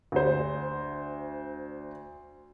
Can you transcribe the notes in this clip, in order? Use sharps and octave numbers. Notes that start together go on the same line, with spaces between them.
D2 C5